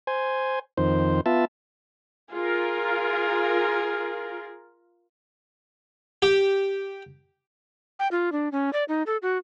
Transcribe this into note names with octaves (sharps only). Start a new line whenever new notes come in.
C5 G#5
F2 D#3 C5
B3 F4 E5 A5
F4 G#4 A#4
G4
G5
F4
D4
C#4
D5
D#4
A4
F#4